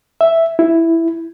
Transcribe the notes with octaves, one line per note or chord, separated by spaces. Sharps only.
E5
E4